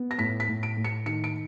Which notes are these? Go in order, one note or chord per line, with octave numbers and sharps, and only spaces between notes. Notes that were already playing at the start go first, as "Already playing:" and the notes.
Already playing: B3
A#6
A2 B6
B6
A2
D7
A2
C#7
D#3 C#7
D7